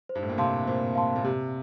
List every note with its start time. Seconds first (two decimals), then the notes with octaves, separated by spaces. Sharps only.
0.09 C5
0.15 G2
0.23 A2
0.30 A#2
0.38 C3 F5 A5 C6
0.67 A#2 C5
0.95 F5 A5 C6
1.16 A#2
1.24 C3 G4